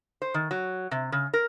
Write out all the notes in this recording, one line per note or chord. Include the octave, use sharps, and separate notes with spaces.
C5
D#3
F#3
C3
C#3
A#4